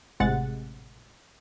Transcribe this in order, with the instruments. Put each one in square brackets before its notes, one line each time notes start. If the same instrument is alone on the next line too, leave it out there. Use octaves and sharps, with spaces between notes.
[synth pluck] G#1 A2 C3 G#3 F#5 A6